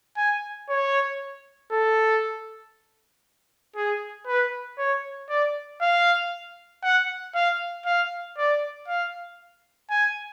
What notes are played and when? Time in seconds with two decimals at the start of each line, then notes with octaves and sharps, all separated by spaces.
0.17 G#5
0.69 C#5
1.71 A4
3.76 G#4
4.27 B4
4.78 C#5
5.29 D5
5.81 F5
6.83 F#5
7.35 F5
7.86 F5
8.37 D5
8.88 F5
9.90 G#5